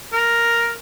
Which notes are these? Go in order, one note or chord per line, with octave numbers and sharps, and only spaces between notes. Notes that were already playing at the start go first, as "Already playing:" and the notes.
A#4